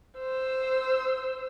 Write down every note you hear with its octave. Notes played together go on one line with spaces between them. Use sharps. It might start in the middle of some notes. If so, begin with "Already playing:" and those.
C5 E6